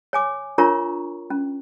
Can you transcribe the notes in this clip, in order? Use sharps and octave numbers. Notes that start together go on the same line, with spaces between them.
C#5 G#5 D6
D4 F4 A#4 C#5 A#5 C#6
C#4